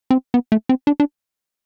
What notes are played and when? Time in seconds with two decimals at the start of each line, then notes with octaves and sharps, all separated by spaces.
0.11 C4
0.34 B3
0.52 A3
0.69 C4
0.87 D4
1.00 D4